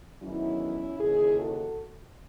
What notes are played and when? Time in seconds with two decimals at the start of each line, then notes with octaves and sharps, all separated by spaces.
0.21 E2 D#3 F#3 C#4 E4
0.99 D#2 C#3 E3 E4 G#4
1.38 F#4 A4